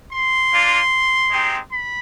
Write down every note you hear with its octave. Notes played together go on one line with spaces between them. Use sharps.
C6
A#3 D4 F4
G#3 C4 D#4 G4
B5